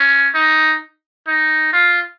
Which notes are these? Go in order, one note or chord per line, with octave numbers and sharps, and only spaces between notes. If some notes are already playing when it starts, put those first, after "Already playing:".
Already playing: C#4
D#4
D#4
F4